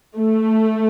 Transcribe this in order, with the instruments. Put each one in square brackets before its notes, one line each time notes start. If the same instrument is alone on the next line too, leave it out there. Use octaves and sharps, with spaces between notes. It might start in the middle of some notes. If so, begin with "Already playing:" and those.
[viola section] A3